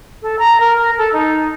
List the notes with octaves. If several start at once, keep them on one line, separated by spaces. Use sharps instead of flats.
A4
A#5
A#4
A4
D#4